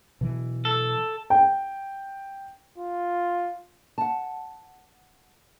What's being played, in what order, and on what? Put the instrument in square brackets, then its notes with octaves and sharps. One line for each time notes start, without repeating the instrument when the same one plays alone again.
[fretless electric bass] B2 E3 F#3
[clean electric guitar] A4
[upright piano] G5
[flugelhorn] F4
[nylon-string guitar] F#5 A5